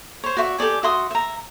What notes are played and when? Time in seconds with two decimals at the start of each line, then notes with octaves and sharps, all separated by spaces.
0.24 C5 C#5
0.37 F#4 D5 E5 C#6
0.59 G4 A4 D5 G#5
0.83 F#4 E5 C6 D#6
1.11 E5 A#5